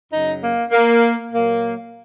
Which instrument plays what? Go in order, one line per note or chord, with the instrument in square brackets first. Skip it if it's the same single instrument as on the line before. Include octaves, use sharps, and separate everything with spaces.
[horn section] F#2 C#3 F#3 D#4
A#3
A#3
A#2 F#3 A#3